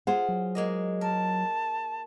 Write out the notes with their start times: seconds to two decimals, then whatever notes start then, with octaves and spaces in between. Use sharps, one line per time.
0.07 F4 G#4 C5 F#5
0.29 F#3
0.55 G#3 A#3 D#5
1.01 A#4 A5